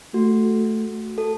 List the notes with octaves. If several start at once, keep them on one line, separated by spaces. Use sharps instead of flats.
A3 F#4
A4